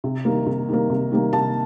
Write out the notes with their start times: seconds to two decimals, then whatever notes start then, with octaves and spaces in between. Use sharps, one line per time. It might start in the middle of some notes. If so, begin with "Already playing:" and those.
0.04 C3
0.25 D#3 G3 A#3
0.46 C3
0.69 D#3 G3 A#3
0.90 C3
1.11 D#3 G3 A#3
1.33 C3 A5